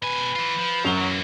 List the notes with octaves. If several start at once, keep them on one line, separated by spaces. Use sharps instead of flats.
B2 B4 G#5
E3 F4
F3
F#2 F#3 F7 G7
E3 A#3